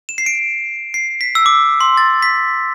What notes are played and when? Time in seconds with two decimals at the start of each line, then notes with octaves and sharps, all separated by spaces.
0.09 E7
0.18 C7
0.26 D7
0.94 C7
1.21 B6
1.35 E6
1.46 D6
1.81 C6
1.97 A6
2.23 B6